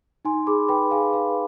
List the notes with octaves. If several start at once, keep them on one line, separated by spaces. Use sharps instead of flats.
D#4 G#5 C6
G#4 B5 D6
B4 G5 B5
G#4 F5 G#5
B4 F5